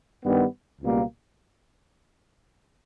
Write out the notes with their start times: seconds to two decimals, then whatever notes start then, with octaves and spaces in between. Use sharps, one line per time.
0.23 G2 D#3 G3 B3
0.81 C#2 B2 G3 A#3